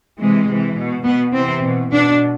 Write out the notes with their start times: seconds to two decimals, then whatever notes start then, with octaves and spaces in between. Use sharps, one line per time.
0.19 C3 E3 G#3
0.49 C3 E3
0.77 B2
1.05 B2 B3
1.34 C3 E3 C4
1.64 B2
1.92 B2 D4